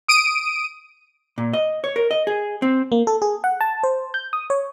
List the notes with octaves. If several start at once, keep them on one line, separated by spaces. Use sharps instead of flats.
D#6 D7 D#7
A#2
D#5
C#5
A#4
D#5
G#4
C4
A#3
A4
G#4
F#5
A5
C5
G6
D#6
C#5